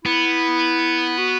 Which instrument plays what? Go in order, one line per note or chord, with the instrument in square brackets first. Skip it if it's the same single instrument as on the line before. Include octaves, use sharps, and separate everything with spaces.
[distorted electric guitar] B3 [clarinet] E4
[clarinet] F#4